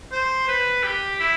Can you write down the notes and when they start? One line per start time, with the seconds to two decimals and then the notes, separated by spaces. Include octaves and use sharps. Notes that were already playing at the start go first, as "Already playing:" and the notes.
0.12 C5
0.48 B4
0.83 G4
1.19 E4